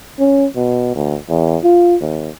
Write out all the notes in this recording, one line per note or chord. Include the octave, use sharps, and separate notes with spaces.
C#4
B2
D2
E2
F4
D#2